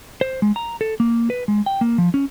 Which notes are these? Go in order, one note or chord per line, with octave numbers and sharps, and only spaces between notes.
C5
G#3
A#5
A4
A#3
B4
G#3
G5
A#3
F3
C#4